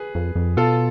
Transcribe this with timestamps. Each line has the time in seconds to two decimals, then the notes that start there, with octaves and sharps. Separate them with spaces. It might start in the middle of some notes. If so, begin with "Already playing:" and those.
Already playing: G#4 B4
0.15 F2
0.35 F2
0.57 B2 F4 A4